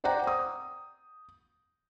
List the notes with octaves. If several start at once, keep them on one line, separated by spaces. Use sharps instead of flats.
C5 D5 F#5 G5 A#5
D#6